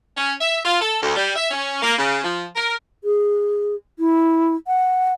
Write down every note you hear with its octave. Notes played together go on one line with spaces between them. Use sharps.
C#4
E5
F4
A4
D2
G3
E5
C#4
A#3
C#3
F3
A#4
G#4
E4
F#5